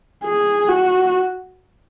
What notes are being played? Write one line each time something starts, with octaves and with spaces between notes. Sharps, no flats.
G#4
F#4